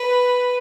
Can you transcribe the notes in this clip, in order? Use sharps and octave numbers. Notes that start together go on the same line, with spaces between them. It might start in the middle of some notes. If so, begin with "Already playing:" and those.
Already playing: B4